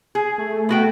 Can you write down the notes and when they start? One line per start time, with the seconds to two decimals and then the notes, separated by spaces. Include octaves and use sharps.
0.15 G#4
0.38 A3
0.69 B3 F#4 G5